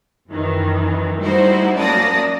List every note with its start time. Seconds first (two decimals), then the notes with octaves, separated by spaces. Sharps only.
0.30 F#2 D#3 E3
1.20 G3 A3 D#4 E4 F#4 C5
1.76 F#2 A#3 D5 A5 D#6 A#6